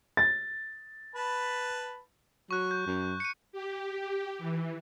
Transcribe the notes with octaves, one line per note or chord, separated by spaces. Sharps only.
A6
B4 A5 B5
F#3 C#6 F#6
G6
F#2
C#7 D#7
G4
E3